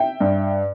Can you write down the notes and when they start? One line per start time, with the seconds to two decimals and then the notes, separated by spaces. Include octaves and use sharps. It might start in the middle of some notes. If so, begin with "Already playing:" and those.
Already playing: E5 G5
0.20 G2